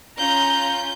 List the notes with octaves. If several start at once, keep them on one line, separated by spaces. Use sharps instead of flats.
C#4 F4 A#5 G6